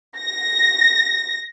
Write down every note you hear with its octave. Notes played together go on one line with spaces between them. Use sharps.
A#6